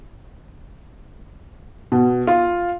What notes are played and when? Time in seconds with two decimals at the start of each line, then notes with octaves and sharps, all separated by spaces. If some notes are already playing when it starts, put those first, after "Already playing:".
1.92 B2
2.27 F4